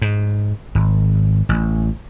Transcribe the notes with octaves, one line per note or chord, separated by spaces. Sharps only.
G#2
G#1
A1